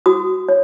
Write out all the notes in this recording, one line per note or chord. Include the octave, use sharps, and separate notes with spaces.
F#4 D#6
C#5